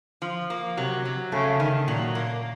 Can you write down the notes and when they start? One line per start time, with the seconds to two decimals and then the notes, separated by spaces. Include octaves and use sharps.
0.22 F3
0.50 A#3
0.77 C3 F#3
1.05 F#3
1.32 C#3 A3
1.60 D#3
1.87 A#2 F#3
2.15 A#3